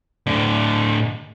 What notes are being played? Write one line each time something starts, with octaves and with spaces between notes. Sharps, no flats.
A2 D3